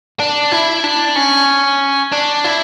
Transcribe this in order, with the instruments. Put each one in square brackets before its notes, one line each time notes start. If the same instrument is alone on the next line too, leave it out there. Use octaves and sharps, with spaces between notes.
[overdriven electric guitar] D4
E4
D4
C#4
D4
E4